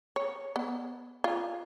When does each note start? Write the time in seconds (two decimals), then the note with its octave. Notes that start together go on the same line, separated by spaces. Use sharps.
0.16 C#5
0.56 B3
1.24 F4